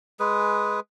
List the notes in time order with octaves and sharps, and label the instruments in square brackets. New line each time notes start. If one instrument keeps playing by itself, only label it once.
[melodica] G#3 G#4 B4